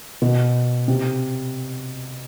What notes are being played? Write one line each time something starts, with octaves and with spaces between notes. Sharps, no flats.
B2
C3